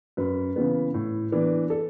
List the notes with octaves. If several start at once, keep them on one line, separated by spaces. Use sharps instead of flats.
F#2 B4
C#3 E3 B3
A2
E3 B3 D4
A4